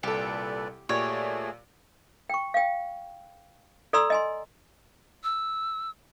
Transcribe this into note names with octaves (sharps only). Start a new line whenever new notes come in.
C2 A#2 G4 A4 B4 D5
A#2 A3 G4 G#4 C#5 D5
G5 C#6
F5 G5
A4 D5 A#5 C6 E6
D#5 G#5 C6
E6